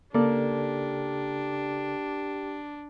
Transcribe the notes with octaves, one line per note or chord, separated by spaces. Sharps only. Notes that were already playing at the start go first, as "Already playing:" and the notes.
C#3 A#3 D4 G4 A4 D5